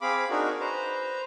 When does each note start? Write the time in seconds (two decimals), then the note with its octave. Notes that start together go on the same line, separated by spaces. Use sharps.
0.01 C4 G#4 F5 B5 D6
0.30 D4 D#4 F#4 G#4 A#4
0.60 B4 C5 A#5